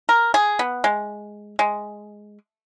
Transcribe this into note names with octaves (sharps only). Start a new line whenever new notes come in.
A#4
G#4
B3
G#3
G#3